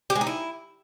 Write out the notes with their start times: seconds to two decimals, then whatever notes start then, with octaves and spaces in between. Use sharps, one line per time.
0.10 G4
0.16 G#3
0.21 D#4
0.27 E4